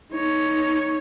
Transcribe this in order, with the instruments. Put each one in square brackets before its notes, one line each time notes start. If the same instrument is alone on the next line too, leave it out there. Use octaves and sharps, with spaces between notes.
[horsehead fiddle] D#4 C#5